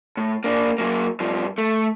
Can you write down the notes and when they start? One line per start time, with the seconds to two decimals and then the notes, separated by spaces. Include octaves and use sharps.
0.17 A2
0.44 A#3 D4
0.78 F#3 A#3
1.20 G2 F3
1.58 A3